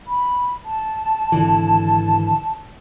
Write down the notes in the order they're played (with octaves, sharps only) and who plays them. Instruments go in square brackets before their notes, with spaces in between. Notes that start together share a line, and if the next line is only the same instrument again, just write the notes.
[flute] B5
A5
[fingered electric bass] G#1 D3 E3